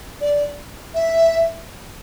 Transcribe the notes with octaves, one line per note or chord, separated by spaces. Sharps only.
D5
E5